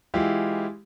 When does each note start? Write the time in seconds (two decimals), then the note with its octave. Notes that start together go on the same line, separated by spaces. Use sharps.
0.14 E3 G#3 E4 F4 G4